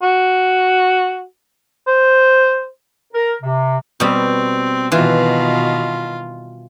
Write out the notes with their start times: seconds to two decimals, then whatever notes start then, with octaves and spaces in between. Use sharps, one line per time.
0.03 F#4
1.87 C5
3.13 A#4
3.42 C3
4.00 B2 G3 C4
4.92 B2 D#3 E3 F4